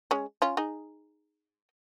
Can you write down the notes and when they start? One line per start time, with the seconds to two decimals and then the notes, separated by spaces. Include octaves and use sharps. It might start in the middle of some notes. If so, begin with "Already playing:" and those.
0.11 G#3 C#4
0.42 C#4 F4
0.57 D#4 G#4